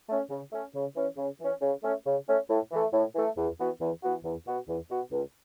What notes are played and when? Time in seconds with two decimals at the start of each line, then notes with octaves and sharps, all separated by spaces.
0.09 A3 C#4
0.30 C#3
0.52 A3 C#4
0.75 C#3
0.96 E3 C#4
1.17 C#3
1.40 E3 C#4
1.61 C#3
1.83 A3 C#4
2.06 C#3
2.28 A3 C#4
2.49 A2
2.72 E3 A3
2.93 A2
3.14 E3 A3
3.37 E2
3.59 E3 B3 F#4
3.80 E2
4.03 E3 B3 F#4
4.24 E2
4.46 B2 B3 F#4
4.68 E2
4.90 B2 B3 F#4
5.12 C#2